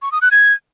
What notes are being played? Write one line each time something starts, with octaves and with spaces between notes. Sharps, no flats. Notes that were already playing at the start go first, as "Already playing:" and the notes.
C#6
D#6
F#6
G#6